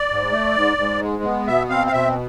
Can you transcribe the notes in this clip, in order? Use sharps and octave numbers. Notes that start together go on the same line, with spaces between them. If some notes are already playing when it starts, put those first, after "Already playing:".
Already playing: D5
G#2
A3
G#2
G#2
G#3
B3
B2 E5
C4 F5
F5
B2 E5